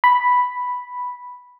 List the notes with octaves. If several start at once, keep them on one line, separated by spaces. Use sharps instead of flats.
B5